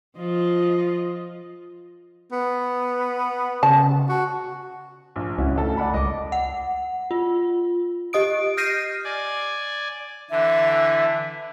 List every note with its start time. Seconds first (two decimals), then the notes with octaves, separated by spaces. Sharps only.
0.17 F3 F4 D#5
2.32 B3
3.63 C#3 A5
4.09 F#4
5.16 A#1
5.38 C#2 C#4 E4 F#4
5.56 D2 A4
5.77 D5 F#5 B5
5.94 C#2 D#5 D6
6.32 F#5
7.11 F4
8.13 G4 D#5 D#6 D7
8.57 F6 G6 A#6 C7 D#7
9.05 D5 G#5
10.30 D3 E3 E5